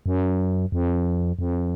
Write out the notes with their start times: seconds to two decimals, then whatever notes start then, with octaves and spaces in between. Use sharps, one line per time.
0.06 F#2
0.72 F2
1.39 F2